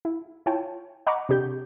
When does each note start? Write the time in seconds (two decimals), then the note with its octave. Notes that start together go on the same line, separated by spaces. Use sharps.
0.05 E4
0.46 E4 F4 C#5 G5 A5
1.07 D#5 F#5 A#5 B5 C#6 D6
1.29 C3 D4 G4 G6